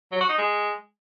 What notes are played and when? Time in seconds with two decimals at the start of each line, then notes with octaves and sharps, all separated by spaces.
0.12 F#3
0.21 F#4
0.29 D#4
0.38 G#3